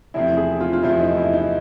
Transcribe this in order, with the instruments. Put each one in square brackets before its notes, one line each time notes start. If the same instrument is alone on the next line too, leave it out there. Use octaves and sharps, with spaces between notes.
[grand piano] E2 C3 F3 A3 C4 [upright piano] E4
[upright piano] G#4
F4
F4
[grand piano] E2 C3 F3 A3 C4 [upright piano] E4
[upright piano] D#4
E4
D#4